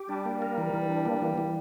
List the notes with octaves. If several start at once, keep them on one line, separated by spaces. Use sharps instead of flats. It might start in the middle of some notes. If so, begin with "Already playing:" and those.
Already playing: G4
G3 D4
A#3
A#4
E3
E3
D4
A#3
E3
E3